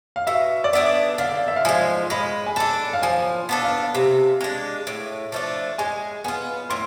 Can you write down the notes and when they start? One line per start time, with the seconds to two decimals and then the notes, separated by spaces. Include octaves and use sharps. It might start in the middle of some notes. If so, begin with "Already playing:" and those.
0.16 F5
0.27 B2 E5
0.64 D5
0.73 B3 D4 G#4 E5
1.18 D3 F5
1.48 E5
1.56 F5
1.65 F3 G#3 G#5
2.10 G#3 B5
2.46 G#5
2.56 D4 A4 A5
2.93 F5
3.02 F3 G#5
3.49 B3 D4 A4
3.64 F5
3.95 C3
4.41 G#3 D4
4.87 A2
5.32 F3 A3 D4
5.78 G#3 G#5
6.24 B3 F4 G#5
6.70 A2 C6